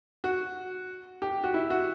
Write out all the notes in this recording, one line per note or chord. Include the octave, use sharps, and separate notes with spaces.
F#4
G4
F#4
E4
F#4